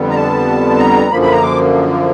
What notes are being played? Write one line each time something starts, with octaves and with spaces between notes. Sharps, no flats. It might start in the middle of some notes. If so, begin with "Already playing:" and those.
Already playing: F2 D3 G3 B3
A#5
A5
A#5
F#2 D3 F3 A#3 B5
B5
A#5
D6